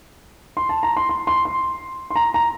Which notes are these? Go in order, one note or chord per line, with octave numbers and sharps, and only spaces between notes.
C6
A5
A#5
C6
C6
C6
C6
C6
A#5
A#5